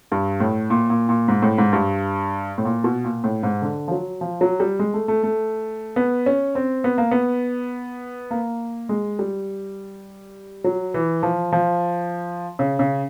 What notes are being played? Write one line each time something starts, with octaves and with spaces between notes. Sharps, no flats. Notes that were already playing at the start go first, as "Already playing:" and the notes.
G2
A2
A#2
A#2
A#2
G#2
A2
G#2
G2
A2
A#2
B2
A#2
A2
G#2
D3
F3
F#3
F3
F#3
G3
G#3
A3
A3
A3
B3
C#4
C4
B3
A#3
B3
A#3
G#3
G3
F#3
E3
F3
F3
C#3
C#3